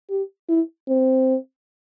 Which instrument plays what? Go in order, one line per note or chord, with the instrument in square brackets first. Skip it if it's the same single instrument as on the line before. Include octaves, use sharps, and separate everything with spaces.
[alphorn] G4
E4
C4